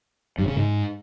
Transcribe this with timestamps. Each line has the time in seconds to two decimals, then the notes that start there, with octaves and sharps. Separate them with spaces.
0.38 G2
0.47 C#3
0.56 G#2